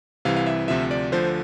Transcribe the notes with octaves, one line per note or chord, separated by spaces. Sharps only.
C2 C3 E3 F5
F5
E5
D2 C3 F3 E5
D5
D2 D3 F3 C5